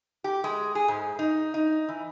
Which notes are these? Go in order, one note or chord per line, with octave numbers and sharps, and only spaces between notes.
G4
G#3
G#4
G#2
D#4
D#4
E3